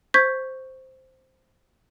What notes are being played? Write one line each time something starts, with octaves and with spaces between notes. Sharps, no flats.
C5 C#6 G6 G#6 B6